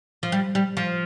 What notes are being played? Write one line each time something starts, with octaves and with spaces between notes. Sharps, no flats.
F3
G3
G3
F3